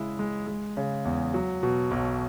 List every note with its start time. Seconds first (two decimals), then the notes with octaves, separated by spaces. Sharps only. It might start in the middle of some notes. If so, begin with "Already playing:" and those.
Already playing: C#3 G#3 E4
0.19 G#3
0.47 G#3
0.77 C#3
1.05 E2
1.34 F#3
1.63 B2
1.91 B1